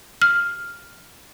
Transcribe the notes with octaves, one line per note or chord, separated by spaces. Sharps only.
F6